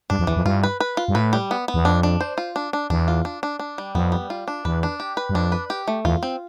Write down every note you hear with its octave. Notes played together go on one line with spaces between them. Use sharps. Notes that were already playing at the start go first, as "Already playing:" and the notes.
G2 D4
F2
E2 E3
F2
G2 F4
B4
B4
F4
G2
A2 B4
G3
B3
B3
E2
F2 D4
D4
C5
F4
D4
D4
E2 D4
F4
D4
D4
D4
G3
F2 B3
G3
F4
D4
E2 B4
D4
G4
B4
G2
F2 D4
B4
G4
A3
E2 F4
C4